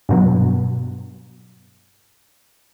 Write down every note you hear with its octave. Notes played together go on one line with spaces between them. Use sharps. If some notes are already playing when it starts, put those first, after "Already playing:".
G2 B2 F#3